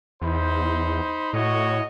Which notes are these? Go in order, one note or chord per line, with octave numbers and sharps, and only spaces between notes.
E2 D#4 C5 B5
A2 F#4 C#5 D#5